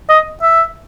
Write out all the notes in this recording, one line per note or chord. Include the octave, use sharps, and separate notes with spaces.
D#5
E5